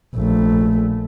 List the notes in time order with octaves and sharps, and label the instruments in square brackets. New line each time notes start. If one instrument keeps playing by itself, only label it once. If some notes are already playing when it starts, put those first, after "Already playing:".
[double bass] A#1 A3